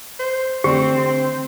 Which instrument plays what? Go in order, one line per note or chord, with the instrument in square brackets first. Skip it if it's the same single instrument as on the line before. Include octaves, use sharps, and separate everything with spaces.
[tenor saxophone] C5
[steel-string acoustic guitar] D3 A3 [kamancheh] C4 [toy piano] G4 [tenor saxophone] C5